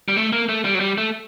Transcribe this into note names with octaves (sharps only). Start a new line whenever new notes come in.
G3
A3
A#3
A3
G3
F#3
G3
A3